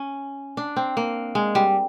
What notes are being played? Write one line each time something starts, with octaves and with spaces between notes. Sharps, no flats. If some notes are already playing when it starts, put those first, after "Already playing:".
Already playing: C#4
D4
C4
A#3
G#3
G3